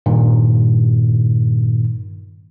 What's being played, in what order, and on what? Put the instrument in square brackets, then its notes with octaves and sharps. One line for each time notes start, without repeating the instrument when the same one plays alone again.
[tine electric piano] G2 A#2 D#3